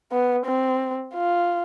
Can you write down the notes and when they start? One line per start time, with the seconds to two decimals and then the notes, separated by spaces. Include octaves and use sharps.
0.12 B3
0.46 C4
1.14 F4